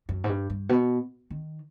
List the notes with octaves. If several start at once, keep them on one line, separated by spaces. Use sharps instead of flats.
F#2
G#2
G2
G2
B2
D#3